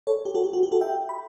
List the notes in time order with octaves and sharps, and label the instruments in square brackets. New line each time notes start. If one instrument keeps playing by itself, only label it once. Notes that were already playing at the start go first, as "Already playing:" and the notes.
[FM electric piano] A4 C#5
G4
F#4 A4
G4
F#4
G4
F#4 A4
E5 G5
B5